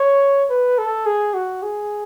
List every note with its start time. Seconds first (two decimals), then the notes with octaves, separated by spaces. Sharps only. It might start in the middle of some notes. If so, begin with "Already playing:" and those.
Already playing: C#5
0.50 B4
0.78 A4
1.06 G#4
1.34 F#4
1.63 G#4